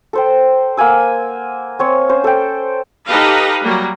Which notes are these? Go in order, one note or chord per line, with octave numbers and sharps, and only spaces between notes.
A4 C5 G5
A#3 F#5 G#5 E6
C4 C#5
C#4 C5
A4 G5
D#4 G4 A4 B4 D#5 F5
F#3 G3 A#3